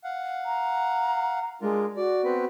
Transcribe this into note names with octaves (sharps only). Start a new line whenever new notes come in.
F5 F#5
A#5
G#3 D4 F4 A#4
F#4 D5
B3 C4 B4